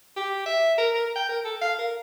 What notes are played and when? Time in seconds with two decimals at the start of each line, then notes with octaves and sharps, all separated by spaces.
0.16 G4
0.46 E5
0.78 A#4
0.94 A#4
1.16 G5
1.29 A#4
1.45 A4
1.62 F5
1.79 A#4